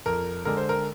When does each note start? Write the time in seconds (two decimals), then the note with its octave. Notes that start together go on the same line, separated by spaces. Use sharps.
0.06 F2 A#4
0.45 D3 G#3 A#4
0.57 C5
0.69 A#4